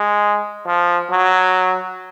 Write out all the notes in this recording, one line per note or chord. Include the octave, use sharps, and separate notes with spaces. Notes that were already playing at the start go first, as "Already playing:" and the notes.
Already playing: G#3
F3
F#3